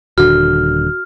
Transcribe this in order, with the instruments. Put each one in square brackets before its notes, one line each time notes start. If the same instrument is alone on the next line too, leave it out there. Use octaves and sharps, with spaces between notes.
[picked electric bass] D#1 D3 [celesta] F#4 [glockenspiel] F6